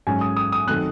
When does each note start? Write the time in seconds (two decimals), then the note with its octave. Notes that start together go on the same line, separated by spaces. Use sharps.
0.07 G#2 F#3 C#4 G#5
0.21 D#6
0.36 D#6
0.52 D#6
0.67 D#3 F#3 A3 C4 F#6